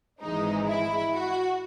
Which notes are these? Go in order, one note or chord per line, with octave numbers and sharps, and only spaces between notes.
G#1 G#2 E3 G#3 D#4
E4
F#4